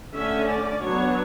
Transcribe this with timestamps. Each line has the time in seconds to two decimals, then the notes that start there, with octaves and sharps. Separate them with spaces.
0.14 D3 A3 C#4 E5
0.48 D5
0.81 F#3 B3 D4 C#5